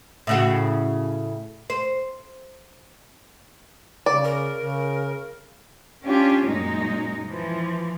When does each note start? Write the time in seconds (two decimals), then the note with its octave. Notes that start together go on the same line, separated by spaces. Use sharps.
0.27 A2 C#3 F#4
1.70 C5
4.06 C#3 D5
4.24 A#4
4.57 C#3
6.04 C#4 D4 F4 G4
6.47 F#2 A#2 G#3 D#4
7.27 E3 F3